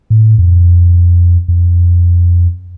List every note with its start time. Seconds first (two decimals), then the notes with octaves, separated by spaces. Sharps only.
0.10 A2
0.38 F2
1.48 F2